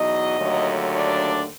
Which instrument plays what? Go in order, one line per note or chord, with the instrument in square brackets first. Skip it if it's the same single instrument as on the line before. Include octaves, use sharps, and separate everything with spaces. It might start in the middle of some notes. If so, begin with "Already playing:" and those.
Already playing: [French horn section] E2 B2 F#3 D#4 D#5
D#2 D3 F#3 A3
D4 D5